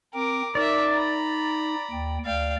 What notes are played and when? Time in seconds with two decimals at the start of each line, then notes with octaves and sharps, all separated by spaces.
0.14 C4 A#4 D6
0.55 D#4 A#4 D5 E5
0.93 A#5 B5
1.91 D#2 G5
2.25 D2 D5 F5 G5